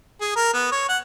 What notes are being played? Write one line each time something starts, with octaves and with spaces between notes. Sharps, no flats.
G#4
A#4
B3
C#5
F#5